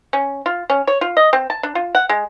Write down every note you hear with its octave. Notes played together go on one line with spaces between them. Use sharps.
C#4
F4
C#4
C#5
F4
D#5
C4
A5
D4
F4
F#5
G#3